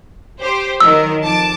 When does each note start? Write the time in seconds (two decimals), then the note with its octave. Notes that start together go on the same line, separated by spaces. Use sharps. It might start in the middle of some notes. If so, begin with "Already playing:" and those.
0.41 G4 C5
0.81 D#3 F#3 A#4 E6
1.23 F2 A5 D6